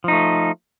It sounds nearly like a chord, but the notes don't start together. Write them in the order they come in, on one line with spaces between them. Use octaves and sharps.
F3 D#4 A3